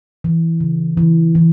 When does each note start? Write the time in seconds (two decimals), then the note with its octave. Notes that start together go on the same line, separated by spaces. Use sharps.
0.24 E3
0.60 C#3
0.97 E3
1.35 E3